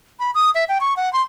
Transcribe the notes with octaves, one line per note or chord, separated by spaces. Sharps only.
B5
D#6
E5
G5
C#6
F#5
C6